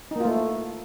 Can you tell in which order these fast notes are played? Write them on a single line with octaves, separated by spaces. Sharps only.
D#4 A#3 F4 A3